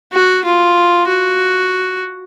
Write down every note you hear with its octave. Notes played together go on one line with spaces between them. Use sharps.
F#4
F4
F#4